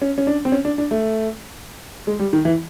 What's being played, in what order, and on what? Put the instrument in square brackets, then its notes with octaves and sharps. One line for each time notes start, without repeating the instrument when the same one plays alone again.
[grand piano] C#4
C#4
D4
C4
C#4
D4
D4
A3
G#3
G3
D#3
E3